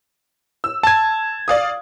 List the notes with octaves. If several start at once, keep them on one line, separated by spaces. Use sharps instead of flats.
E6
A5 G#6
D5 F5 D#6